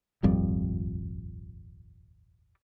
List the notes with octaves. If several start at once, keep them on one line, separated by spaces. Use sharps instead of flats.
D#1 G#1 F2 G3